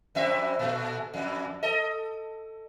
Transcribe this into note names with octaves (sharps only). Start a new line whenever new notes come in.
F2 C4 E5
A#2 A3
F2
A4 D#5